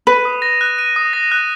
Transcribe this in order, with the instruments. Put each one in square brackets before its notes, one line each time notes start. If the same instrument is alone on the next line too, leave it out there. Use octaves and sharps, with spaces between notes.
[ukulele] B4 [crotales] D#7
[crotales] D#6
A#6
F#6
D#7
D#6
A#6
F#6